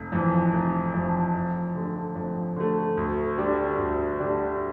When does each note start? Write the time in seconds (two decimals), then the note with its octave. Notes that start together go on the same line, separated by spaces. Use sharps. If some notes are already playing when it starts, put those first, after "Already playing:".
Already playing: F1
0.12 F2 E3
0.53 F1
0.94 F2 E3
1.34 F2
1.75 D3 A3
2.15 F2
2.56 D3 A3
2.97 D2
3.38 D3 G3 D4
3.78 D2
4.19 D3 G3 D4